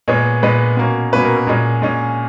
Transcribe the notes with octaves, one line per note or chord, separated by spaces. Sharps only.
A#2 G#3 B3 C#5
A#2 G#3 B3 B4
B2 A#3 C#4
B2 A#3 C#4 B4
A#4
A#4
A#2 G#3 C#4
A#2 G#3 C#4